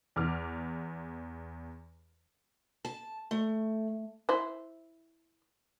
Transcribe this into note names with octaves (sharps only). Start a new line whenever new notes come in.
E2 D6 F6
A5
A3
E4 C5